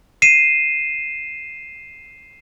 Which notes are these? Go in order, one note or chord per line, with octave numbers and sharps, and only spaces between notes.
C7 D#7 E7